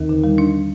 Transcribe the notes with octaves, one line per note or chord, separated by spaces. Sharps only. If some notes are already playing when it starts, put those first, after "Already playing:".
Already playing: D#2 D#3
D3
G3
D4